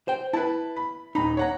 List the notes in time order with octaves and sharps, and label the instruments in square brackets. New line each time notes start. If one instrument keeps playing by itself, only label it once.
[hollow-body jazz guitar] C5 G5
[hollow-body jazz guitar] E4 [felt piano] B4 A5
[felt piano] B5
[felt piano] D#1 A#5 B5 [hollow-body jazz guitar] D#4
[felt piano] C#5 F#5 A#5